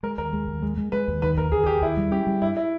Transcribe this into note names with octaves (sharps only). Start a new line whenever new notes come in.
G#3 A#4
D#2 A#4
G#3
D#2
G#3
G#3
G#3 B4
D#2
D#3 B4
D#2 A#4
D#2 G#4
G#4
D#2 G4
D#2 E4
G3
C#4 G4
G3
G2 E4
E4